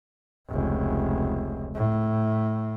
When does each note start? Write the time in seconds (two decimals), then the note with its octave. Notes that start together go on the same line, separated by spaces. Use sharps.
0.49 F1 C#2
1.75 A2